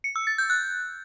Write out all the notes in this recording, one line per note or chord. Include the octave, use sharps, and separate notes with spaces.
C#7
E6
A6
G6
F#6